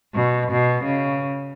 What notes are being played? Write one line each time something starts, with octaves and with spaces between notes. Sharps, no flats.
B2
B2
C#3